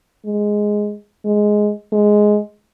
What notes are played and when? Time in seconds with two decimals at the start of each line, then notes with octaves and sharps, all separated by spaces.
0.26 G#3
1.25 G#3
1.93 G#3